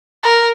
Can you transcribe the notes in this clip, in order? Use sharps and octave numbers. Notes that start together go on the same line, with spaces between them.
A#4